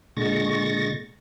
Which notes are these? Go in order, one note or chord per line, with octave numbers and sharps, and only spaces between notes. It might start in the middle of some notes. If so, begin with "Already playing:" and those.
A#2 D3 G#3 C#6 A6 A#6